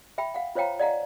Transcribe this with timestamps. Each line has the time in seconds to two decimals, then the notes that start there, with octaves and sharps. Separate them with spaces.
0.18 E5 G5 B5
0.34 F5 F#5
0.55 F4 C5 C#5 F5 G5 A#5
0.79 D5 D#5 F5 F#5 A#5